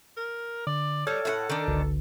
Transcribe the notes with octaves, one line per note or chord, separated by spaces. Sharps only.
A#4
D3 D5
G3 A4 C#5 F6 G#6
A2 F4 F#5
D#3 D4
G1 C#2 D3